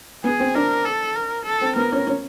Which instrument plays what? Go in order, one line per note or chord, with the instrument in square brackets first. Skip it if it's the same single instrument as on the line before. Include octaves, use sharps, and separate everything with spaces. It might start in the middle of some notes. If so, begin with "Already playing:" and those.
[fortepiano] B3 [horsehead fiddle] G#4
[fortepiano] C4
[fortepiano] D4 [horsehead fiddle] A#4
[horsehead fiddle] A4
A#4
A4
[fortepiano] C4
[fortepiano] B3 [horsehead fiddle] A#4
[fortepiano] C#4
C#4